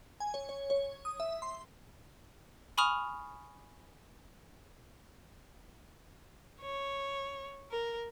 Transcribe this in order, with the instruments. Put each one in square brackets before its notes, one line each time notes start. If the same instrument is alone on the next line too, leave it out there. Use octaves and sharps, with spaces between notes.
[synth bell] G#5
C#5
C#5
C#5
D#6
E5
C6
[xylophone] G#5 B5 C#6 D#6 F6 F7
[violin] C#5
A#4